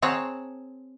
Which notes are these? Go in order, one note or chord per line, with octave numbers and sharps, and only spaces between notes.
C4 G#4 C#5 F#5 A5 A#5